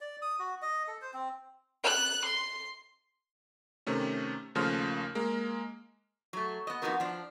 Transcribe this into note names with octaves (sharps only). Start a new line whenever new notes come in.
D5
D#6
F#4
D#5
A4
C5
C4
F#6
C6
C3 D#3 A3 C#4
D#2 C#3 F3 A3 C6 F6
G#3 A#3
F#3 A3
B3 D#5
F2 C#3 B3 D#4 F#4 A#4
F3 D4